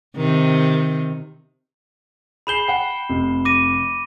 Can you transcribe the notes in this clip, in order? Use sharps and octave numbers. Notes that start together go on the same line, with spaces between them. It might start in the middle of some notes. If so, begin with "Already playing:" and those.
C3 D#3
G#4 B5 G6 C7 E7 G7
F#5 G5 C7
F1 C3
D6 A#6 D#7